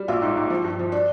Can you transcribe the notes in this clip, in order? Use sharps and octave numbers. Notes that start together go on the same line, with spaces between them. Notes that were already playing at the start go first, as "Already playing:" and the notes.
Already playing: G3
A#1 F4
G#2
G#2
F3
G2
F3
D4